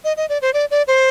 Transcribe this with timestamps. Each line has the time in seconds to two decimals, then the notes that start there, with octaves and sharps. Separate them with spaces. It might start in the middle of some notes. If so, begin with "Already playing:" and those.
0.04 D#5
0.17 D#5
0.29 D5
0.42 C5
0.54 D5
0.71 D5
0.87 C5